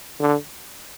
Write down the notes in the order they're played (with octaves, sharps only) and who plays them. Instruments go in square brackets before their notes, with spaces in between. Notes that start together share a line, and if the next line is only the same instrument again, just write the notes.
[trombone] D3